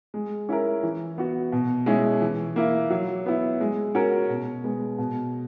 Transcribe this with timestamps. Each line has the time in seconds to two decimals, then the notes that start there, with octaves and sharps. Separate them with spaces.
0.14 G#3
0.49 C#4 E4 A#4
0.83 E3
1.18 B3 F#4
1.52 B2
1.86 G#3 C#4 E4
2.21 E3
2.56 A#3 E4
2.90 F#3
3.26 B3 E4
3.61 G#3
3.95 C#4 F#4 A#4
4.29 B2
4.64 G#3 B3
4.98 B2